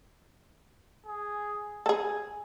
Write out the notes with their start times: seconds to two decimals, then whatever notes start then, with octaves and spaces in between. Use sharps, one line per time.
1.06 G#4
1.86 G#4 A4 G#5